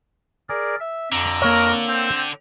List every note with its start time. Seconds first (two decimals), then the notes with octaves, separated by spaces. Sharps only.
0.49 G#4 A#4 D5 G#5
0.80 E5
1.12 F2 D3 A#5 D6
1.42 A#3 A#4 C#5
1.88 C4 G5